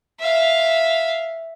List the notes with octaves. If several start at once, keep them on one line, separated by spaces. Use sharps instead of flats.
E5 F5